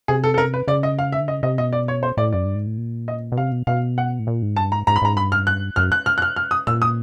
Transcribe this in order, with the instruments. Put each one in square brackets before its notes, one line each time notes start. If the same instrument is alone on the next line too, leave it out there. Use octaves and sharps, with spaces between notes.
[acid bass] C3 [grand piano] G#4
[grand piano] A4
A4
A#4
B4
[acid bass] C#3 [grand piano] D5
[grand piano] D#5
F5
E5
[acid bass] D3
[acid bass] C#3 [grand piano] D#5
[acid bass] C3 [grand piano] D#5
[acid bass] B2 [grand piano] D#5
[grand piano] D5
C#5
C5
[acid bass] A2 [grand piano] D5
[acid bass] F#2 [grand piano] D5
[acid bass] G2
G#2
A2
A#2
[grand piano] D#5
[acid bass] B2
[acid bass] C3 [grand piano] F5
[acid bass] B2
[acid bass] B2 [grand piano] F5
[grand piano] F#5
[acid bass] A2
A#2
G#2
[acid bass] G2 [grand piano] A5
[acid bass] G#2 [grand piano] A#5
[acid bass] G#2 [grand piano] A#5
[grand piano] B5
[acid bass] G#2 [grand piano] A#5
[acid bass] G2 [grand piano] B5
[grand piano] F6
F#6
[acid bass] F#2 [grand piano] F6
[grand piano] F#6
F6
F#6
F6
F6
D#6
[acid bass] A#2 [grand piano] E6
[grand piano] D#6